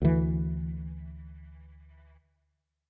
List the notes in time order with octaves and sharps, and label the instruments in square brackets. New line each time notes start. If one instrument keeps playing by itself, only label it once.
[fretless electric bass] D2 E3